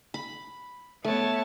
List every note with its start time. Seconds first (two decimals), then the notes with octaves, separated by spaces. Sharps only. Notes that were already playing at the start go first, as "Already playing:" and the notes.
0.14 B5
1.05 A3 B3 C#5 A5